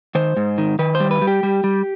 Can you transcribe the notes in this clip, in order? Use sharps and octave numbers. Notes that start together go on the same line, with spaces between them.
D#3 C5
G#2
D#3
D#3 B4
C5
G3
B4
G3
G4
G3
G3